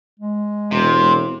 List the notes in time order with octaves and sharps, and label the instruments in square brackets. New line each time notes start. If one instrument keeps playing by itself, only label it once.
[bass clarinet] G#3
[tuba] E1 [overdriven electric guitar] C3